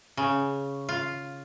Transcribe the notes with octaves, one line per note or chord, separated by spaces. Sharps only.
C#3
F4